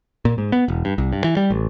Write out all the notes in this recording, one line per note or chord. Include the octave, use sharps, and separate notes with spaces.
A#2
G#2
B3
E1
G2
C2
G2
E3
G3
A1